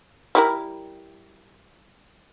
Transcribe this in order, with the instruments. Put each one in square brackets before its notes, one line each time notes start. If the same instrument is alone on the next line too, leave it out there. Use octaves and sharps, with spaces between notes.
[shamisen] G3 E4 A#4